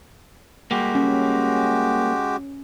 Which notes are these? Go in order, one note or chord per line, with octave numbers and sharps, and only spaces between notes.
G3 G#3 A#3 F#4 G4
C#4